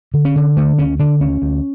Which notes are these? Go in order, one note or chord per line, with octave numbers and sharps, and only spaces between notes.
D3
C#4
D3
D3 A3
D2 C#4
D3 D4
D2 C#4
D2